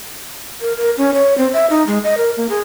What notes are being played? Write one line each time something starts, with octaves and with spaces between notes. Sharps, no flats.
A#4
A#4
C#4
C#5
C4
E5
D#4
G#3
D#5
A#4
A#3
G#4